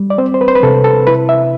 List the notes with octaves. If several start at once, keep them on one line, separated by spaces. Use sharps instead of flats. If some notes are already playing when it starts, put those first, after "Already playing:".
Already playing: G3
D5
C4 C5
C5
B4
C5
B4
C3 A4
A4
E4 B4
E5